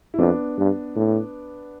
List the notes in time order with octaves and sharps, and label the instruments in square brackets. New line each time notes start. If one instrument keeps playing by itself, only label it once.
[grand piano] E4
[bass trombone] F2 [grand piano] B3 D4
[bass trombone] G2
A2